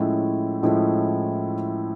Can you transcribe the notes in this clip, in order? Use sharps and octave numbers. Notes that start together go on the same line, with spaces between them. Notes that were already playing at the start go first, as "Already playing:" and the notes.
Already playing: A2 F3 G#3 C#4 E4
A2 F3 G#3 C#4 E4